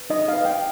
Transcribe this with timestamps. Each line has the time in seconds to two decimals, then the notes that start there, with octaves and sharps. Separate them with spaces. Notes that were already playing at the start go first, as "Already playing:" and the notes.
Already playing: B4
0.10 D#4 D#5
0.28 F5
0.33 B4
0.45 G5